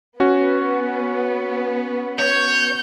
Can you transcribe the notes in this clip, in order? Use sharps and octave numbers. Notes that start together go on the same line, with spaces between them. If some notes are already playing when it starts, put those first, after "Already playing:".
B3 C#4 F#4
C#5 G6